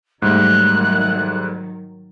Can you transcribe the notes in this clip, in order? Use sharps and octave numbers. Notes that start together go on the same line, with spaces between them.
G#2 D#3 F#3 G3 A3 F#6